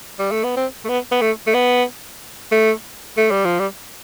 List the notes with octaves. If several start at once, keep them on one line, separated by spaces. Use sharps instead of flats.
G3
A3
B3
C4
A3
B3
B3
A3
A3
B3
A3
A3
G3
F3
G3